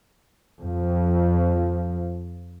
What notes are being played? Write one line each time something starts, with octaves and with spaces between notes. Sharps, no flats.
F2 F3